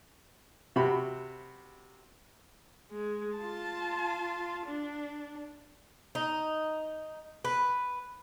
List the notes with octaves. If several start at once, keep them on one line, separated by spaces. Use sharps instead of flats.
C3 F#4 B5
G#3
F4 A5
D4
D#4
B4